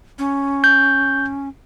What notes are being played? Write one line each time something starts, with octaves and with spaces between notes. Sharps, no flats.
C#4
G6